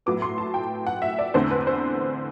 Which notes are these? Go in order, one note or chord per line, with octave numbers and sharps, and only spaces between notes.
A2 F#3 B3 D6
C6
A5
G5
F#5
E5
D5
E2 D3 A3 C4 E4 C5
B4
C5